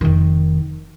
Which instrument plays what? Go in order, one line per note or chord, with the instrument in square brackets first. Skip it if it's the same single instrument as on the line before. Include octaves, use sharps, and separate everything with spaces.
[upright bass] F1 D#3